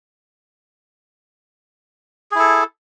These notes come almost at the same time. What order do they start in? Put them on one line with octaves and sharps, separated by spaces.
G#4 E4 A4